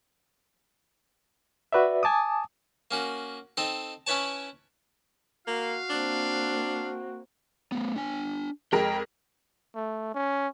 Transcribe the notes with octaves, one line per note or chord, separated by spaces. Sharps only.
F#4 B4 D5 E5
G#5 A5 D6 D#6
A#3 C#4 F#4
C4 D#4 A4 D#5
C#4 E4 B4 C#5 A5
A#3 F#4 F5
A#3 C4 D4
A3 B3
D4 G#5
F2 G#3 A#4 G5
A3
C#4